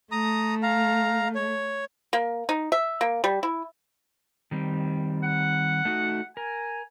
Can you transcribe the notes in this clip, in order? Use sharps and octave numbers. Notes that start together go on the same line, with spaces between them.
A3 A#5 D#6
F5 A#5
C#5
A#3
D#4
E5
A#3
G3
E4
D#3 G3 C4
F#5
A3 D#4 F#4
A#4 G#5